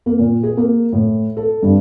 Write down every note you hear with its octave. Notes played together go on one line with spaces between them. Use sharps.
A#3
A#2
G#4
A#3
A2
A4
G2